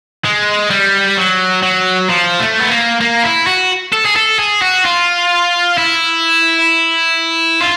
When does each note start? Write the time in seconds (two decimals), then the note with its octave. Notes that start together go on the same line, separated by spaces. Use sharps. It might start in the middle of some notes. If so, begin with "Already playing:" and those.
0.25 G#3
0.70 G3
1.17 F#3
1.63 F#3
2.09 F3
2.40 A3
2.60 B3
2.70 A#3
3.01 A#3
3.24 E4
3.47 F#4
3.93 A4
4.05 G#4
4.16 A4
4.39 G#4
4.62 F#4
4.85 F4
5.77 E4
7.61 F4